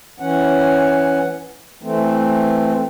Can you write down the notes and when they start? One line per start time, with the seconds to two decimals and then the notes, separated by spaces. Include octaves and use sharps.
0.20 E3 C#4 F#5
1.83 E3 A3 C4